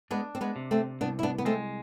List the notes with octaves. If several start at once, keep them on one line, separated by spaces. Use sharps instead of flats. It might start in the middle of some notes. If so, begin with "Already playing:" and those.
G#3 B3 D4
C4
G#3 B3
C3
A3 C4
C2 B3 D4
E4
B3 D4
B3
G#3 A3 C4